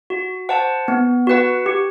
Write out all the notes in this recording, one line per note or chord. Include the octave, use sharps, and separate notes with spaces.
F#4
C5 F#5 A5
B3
F#4 B4 F#5
G4